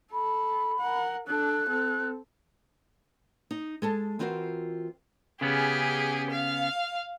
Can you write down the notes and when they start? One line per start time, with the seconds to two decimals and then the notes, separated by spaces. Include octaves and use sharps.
0.13 A4 B5
0.79 A#4 F#5
1.28 D4 A4 F#6
1.69 C4 A4
3.51 D#4
3.82 G#3 A4 A5
4.19 E3 C4 F4 F#4 A#4 C5
5.41 C#3 B3 C#4 G4 G#4
6.31 F5